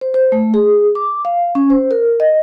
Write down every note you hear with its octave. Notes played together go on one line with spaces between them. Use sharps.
C5
C5
A3
G#4
D6
F5
C#4
C5
A#4
D#5